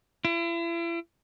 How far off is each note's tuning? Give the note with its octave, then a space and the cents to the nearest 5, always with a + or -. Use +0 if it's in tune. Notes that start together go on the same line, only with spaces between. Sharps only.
E4 +40